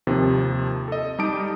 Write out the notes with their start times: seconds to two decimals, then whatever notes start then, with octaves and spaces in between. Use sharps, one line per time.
0.07 D#2 C3 D#3 F3
0.88 A4 D#5
1.18 G3 D#4 G4 A5 D#6 D7